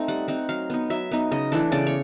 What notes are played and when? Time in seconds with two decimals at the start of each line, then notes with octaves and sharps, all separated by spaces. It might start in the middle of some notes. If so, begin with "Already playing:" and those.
Already playing: A3 C4 D#4
0.08 G3 F#5
0.28 C4 D#4 F#5
0.49 F#3 F5
0.70 B3 D#4
0.90 F#3 E5
1.11 B3 D#4
1.31 C#3 D#5
1.52 E3 A3 D4
1.72 C#3 D5
1.86 C#5